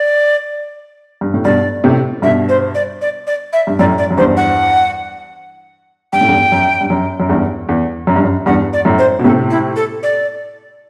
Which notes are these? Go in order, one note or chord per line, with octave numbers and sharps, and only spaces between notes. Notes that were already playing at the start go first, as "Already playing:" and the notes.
Already playing: D5
G2
A2
G2 B2 D5
A2 C3
G2 B2 E5
C5
D5
D5
D5
E5
G2
F#2 A2 D5
D5
F#2
E2 G2 C5
F#5
G2 G5
A2
E2 G2
F#2
G2
F#2
F#2
E2 G2
E2
F#2
G2
F#2
E2 G2 F#5
D5
F#2 A2
C5
B2
A2 C3 A4
E4
A4
D5